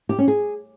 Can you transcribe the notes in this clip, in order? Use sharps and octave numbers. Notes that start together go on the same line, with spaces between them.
G4
C#4
G#4